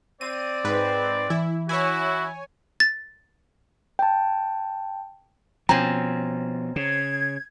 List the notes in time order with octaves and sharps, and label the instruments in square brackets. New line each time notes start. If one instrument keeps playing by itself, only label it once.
[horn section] C4 [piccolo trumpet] D5 [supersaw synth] D#7
[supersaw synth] G#2 B4
[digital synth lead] E3 [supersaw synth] E4
[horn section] E4 [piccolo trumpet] F#4 [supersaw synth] C#5 G#5
[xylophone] A6
[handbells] G5 A5
[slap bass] B2 F3 [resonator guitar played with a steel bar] C4 C#4 [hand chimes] A#5
[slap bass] C#3 [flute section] G#6